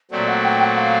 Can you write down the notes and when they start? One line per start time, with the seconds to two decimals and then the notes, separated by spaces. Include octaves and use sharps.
0.11 A#2 F#3 A3 C4 D5
0.27 F#5
0.43 G5
0.60 F#5
0.76 F5